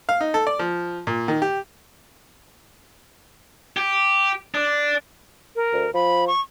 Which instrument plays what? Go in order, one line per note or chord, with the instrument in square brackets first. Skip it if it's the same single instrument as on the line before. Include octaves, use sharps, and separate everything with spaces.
[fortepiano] F5
D#4
A4
D5
F3
A#2
D#3
G4
[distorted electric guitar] G4
D4
[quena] A#4
[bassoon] D2
[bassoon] F3 [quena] B5
[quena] C#6